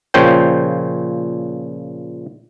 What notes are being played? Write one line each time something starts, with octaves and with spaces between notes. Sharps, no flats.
A#2 C#3 F3 C5 C#5 G5